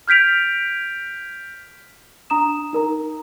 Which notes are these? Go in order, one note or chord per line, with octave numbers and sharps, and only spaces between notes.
F6 G6 B6 D7 F7
D4 A#5 D#6 E7
D#4 A#4 A#5